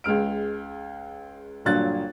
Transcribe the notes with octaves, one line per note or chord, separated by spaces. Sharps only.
C#2 G#3 F6 D7
G1 G2 A#2 F#3 F#6 A6